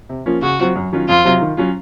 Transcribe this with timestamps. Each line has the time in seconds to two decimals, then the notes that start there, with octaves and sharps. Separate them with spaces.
0.09 C3
0.26 F3 A#3 C#4 F4
0.42 C#3 F#4
0.59 F#3 C4 F4
0.76 F#2
0.92 D#3 F#3 C#4 F4
1.09 F2 F4
1.24 C3 F#3 C4
1.41 D#3
1.57 F#3 C#4 F4